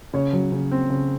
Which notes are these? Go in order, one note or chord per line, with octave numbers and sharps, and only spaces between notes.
C#3 C#5
F#3
C#3
C4
C#3